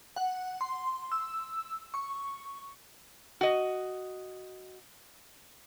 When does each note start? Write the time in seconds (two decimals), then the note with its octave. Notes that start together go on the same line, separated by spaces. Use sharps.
0.16 F#5
0.61 C6
1.12 E6
1.94 C#6
3.41 F#4 D#5